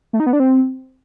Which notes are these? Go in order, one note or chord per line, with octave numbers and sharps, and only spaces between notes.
A3
D#4
B3
D4
C4